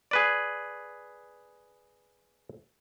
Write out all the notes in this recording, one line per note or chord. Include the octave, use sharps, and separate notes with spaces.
G#4 B4 D5